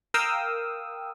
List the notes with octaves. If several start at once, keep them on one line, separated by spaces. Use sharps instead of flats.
A#4 F5 G5 D#6 E6